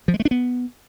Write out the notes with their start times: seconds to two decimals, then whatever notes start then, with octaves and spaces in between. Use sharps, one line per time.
0.08 F3
0.14 G#3
0.20 A3
0.25 D4
0.31 B3